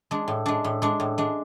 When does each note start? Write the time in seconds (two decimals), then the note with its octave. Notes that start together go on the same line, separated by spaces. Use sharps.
0.11 G#3 D4
0.28 A2
0.46 G#3 D4
0.64 A2
0.82 G#3 D4
1.00 A2
1.18 G#3 D4